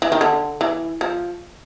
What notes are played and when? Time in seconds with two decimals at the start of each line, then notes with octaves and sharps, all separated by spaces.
0.02 E3
0.12 D#3
0.21 D3
0.61 E3
1.01 F3